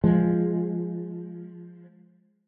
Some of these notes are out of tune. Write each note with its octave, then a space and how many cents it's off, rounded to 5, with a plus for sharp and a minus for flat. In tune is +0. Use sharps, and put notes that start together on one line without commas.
F3 +0 G#3 +0